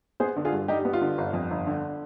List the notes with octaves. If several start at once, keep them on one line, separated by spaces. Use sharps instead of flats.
B3 G#4 C5
D3
F4 G#4
G2
G3 D#4 G4
B3
F4
D3
G1
F2
G1
D3